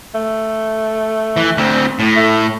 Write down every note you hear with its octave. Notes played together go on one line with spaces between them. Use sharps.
A3
E3
D2 C4
A2
A3